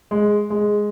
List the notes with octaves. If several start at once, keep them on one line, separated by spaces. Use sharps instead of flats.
G#3
G#3